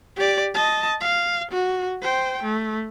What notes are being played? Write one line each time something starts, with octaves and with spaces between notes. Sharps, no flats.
G4 D5
D#5 A5
F5
F#4
C5 G5
A3